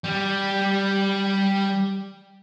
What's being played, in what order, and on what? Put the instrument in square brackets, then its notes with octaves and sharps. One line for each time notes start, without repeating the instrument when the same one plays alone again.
[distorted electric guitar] G3 G4